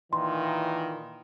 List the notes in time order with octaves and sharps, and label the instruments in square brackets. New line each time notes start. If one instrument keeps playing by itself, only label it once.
[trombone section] A#2 D#3 E3 [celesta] C6